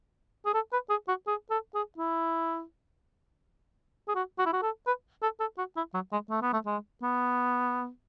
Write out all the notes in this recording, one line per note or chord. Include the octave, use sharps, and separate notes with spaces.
G#4
A4
B4
G#4
F#4
G#4
A4
G#4
E4
G#4
F#4
F#4
E4
F#4
A4
B4
A4
A4
F#4
E4
F#3
G#3
A3
B3
A3
G#3
B3